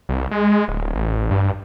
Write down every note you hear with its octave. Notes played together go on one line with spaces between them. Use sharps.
C2
G#3
D1
A1
G2